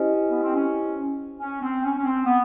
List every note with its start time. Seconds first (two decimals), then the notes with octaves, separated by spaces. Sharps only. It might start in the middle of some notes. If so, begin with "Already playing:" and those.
Already playing: C#4 E4 G4 C5 D#5
0.29 B3
0.41 C4
0.54 C#4
1.40 C#4
1.61 C4
1.84 C#4
1.95 C#4
2.05 C4
2.26 B3